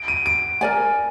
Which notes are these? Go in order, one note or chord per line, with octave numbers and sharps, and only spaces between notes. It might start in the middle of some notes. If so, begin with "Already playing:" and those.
Already playing: D7
D#7
D7
A#4 D5 G#5